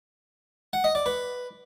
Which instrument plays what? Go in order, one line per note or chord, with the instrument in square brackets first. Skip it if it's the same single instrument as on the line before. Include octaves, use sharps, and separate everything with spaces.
[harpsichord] F#5
D#5
D5
B4